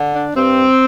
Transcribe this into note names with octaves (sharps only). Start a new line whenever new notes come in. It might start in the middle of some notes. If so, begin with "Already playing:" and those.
Already playing: D3
D4
G2 C4